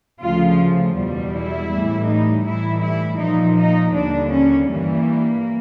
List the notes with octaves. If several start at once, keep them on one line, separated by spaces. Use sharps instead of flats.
D2 C#3 F3 F4
E2 B2 G3
E4
A2 E3 G3
D#4
A2 E3 G3 E4
E4
A#2 F3 D#4
D#4
D#2 D3 G3 D4
C#4
G2 E3 G3 A#3